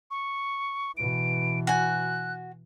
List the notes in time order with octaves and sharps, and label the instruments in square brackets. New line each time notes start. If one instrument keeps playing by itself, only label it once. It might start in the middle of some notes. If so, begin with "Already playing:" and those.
[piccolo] C#6
[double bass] B2 E3 [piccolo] D7
[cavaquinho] F#4 G#5 [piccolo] F#6